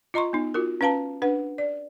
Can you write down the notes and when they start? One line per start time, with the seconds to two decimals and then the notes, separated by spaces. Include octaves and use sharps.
0.14 F4 D#5 A#5 C6 C#6
0.33 B3 D#4
0.54 F4 F#4 A#4
0.81 C#4 B4 F5 A5 A#5
1.22 D4 B4 F#5
1.58 D5